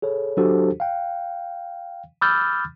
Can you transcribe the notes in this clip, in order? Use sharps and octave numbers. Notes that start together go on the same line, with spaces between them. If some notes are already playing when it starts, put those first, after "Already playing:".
G#4 A4 C#5
F#3 D4 F#4 G4 A4 C5
F5 G5
B5 D6 E6 F6 G6 A6